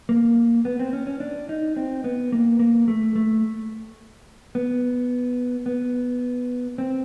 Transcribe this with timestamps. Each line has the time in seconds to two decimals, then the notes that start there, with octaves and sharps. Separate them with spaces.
0.09 A#3
0.65 B3
0.79 C4
0.93 C#4
1.07 C#4
1.20 D4
1.49 D#4
1.76 C4
2.04 B3
2.32 A#3
2.59 A#3
2.88 A3
3.16 A3
4.55 B3
5.66 B3
6.78 C4